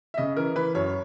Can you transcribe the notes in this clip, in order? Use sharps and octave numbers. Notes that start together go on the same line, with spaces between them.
E5
C#3 D#5
E3 A#4
E3 B4
F#2 C#5